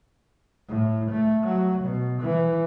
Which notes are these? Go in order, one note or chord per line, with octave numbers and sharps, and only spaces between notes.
A2
A3
F#3
B2
E3